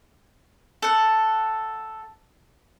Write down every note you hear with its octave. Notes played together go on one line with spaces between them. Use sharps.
A4 F#5